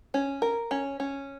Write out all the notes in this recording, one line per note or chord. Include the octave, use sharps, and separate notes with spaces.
C#4
A#4
C#4
C#4